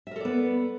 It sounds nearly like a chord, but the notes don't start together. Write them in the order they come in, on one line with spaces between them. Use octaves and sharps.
E5 A#4 A4 D5 B3